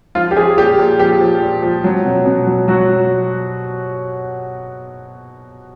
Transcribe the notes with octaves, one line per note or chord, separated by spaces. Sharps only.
F3 F4
G4
F3 G#4
A#2 G4
A#2
F3 G4
F3
A#2
F3
F#3
B2
B2
F#3
F#3 F#4
F#3